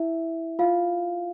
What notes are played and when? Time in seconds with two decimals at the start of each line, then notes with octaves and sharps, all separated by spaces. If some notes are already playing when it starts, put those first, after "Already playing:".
Already playing: E4 E5
0.59 F4 F5